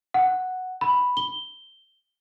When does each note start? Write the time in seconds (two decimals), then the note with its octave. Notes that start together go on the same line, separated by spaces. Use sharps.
0.14 F#5
0.81 B5
1.17 G7